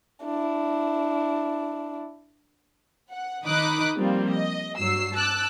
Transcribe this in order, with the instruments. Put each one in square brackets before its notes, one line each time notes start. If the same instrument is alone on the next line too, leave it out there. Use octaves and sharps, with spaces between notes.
[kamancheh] D4 E4
[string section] F#5
D#3 D#4 B5 D6 D#6 F#6
F3 G3 A#3 C4 F4
D#5
G2 F#3 E6 C7
A5 D6 E6 F#6